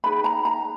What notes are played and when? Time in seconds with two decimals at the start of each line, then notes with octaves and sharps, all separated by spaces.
0.04 D#4 G#4 B4 B5
0.24 A#5
0.45 A#5